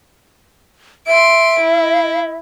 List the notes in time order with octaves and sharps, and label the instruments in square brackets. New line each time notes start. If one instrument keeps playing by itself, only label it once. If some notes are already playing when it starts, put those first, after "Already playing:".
[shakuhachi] E5 [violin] C6 D7
[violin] E4